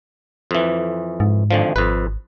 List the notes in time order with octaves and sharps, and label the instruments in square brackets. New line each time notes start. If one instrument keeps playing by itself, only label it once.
[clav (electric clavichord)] F2 E3
[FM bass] G#2
[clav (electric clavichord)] G#1 D3 F3
[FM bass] G#1 [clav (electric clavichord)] F2 B4